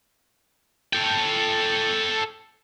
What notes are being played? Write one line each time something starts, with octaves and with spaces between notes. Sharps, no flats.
A4 G5